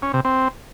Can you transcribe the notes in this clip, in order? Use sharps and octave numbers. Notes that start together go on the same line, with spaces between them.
C#4
C3
C4